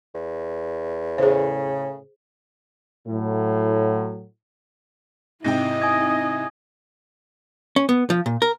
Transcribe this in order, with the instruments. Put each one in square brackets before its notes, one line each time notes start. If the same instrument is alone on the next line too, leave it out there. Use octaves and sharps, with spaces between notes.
[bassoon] E2
[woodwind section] A2 C#3 [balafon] G#4 C5
[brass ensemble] A2 F#3
[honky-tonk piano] G#2 C3 G5 [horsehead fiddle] E4 D#5 [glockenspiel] A#6
[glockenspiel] G#5 D#6 G#6
[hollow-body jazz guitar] C#4
B3
F3
A#2
A#4